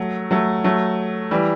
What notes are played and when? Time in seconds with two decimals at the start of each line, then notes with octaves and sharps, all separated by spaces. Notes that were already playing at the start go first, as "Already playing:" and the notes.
Already playing: F#3 A3
0.31 F#3 A3
0.64 F#3 A3
1.31 E3 G3